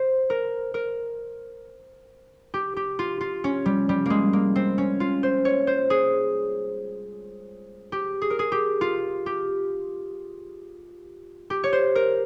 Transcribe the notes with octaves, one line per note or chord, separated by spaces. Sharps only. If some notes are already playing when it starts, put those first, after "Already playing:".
Already playing: C5
A#4
A#4
G4
G4
F4
F4
C#4
G3
G3
G#3 A#3
A#3
C4
C#4
F4
C5
C#5
C5
G#4
G4
G#4
A#4
G#4
G4
F4
G4
G4
C#5
C5
A#4